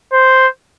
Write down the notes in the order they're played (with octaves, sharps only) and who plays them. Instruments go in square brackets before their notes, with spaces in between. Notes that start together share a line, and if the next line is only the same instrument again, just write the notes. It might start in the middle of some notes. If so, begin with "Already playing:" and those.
[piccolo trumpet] C5